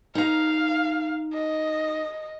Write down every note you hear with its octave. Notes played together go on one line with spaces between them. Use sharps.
D#4 F5 A#5
D#5